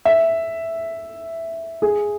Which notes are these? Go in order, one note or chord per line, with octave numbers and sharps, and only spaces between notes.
E5
G#4